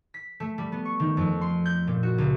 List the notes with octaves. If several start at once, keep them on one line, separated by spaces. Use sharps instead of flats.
B6
A3
G3
B3
C#6
D#3
F2
C6
G6
A#2
F#4
C#2